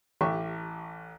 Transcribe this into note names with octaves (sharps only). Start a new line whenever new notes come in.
A1 G4 E5 C#6